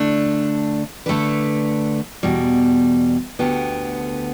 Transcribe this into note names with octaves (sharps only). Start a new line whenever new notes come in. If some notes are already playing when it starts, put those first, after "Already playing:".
Already playing: D3 A3 D4
D3 A3 D4 B4
E2 B2 G3
D2 D3 B3 G4